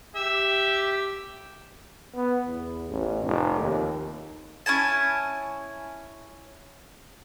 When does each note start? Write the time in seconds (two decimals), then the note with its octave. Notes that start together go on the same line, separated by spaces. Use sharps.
0.16 G4 E5
2.15 B3
2.46 E2
2.90 A1
3.24 F1
3.59 D#2
4.66 C#4 E4 G#5 A5